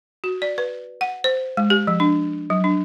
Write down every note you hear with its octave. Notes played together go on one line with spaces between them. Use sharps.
F#4
D5
B4
F#5
C5
G#3
G4
F3
D4
F#3
D4